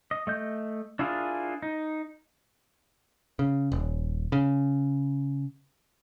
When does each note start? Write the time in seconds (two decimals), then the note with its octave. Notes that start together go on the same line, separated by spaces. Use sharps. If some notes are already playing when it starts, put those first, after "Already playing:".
0.11 D#5
0.27 A3 D#5 G6
0.99 D4 E4 F4 G#4 A#4
1.62 D#4
3.39 C#3
3.72 D#1
4.32 C#3